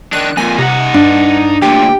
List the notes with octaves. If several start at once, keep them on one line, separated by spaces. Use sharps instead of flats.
D#3 D4 F#6
F2 A#2 G#5
C3 D#4 F#5
G2 D4
D2 A#2 G4 G5